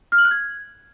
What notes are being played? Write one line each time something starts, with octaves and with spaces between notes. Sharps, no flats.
F6
F#7
F#6
G#6